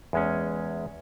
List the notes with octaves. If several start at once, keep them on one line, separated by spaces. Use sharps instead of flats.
E2 G#3 C#4